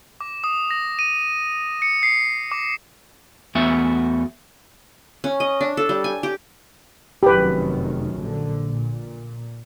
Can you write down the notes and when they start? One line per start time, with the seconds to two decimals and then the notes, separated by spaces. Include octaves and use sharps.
0.21 D6
0.44 D#6
0.71 A#6
0.99 D#7
1.82 C#7
2.03 C7
2.52 D6
3.55 E2 A3 B3 F#4 E5
5.24 C#4
5.40 D#5
5.61 D4
5.77 A4
5.89 G3
6.04 G#5
6.23 G4
7.23 F1 F#2 D#3 G4 B4
8.17 A#1 D3
8.65 A#2